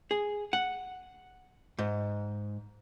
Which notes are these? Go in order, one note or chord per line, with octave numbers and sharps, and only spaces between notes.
G#4
F#5
G#2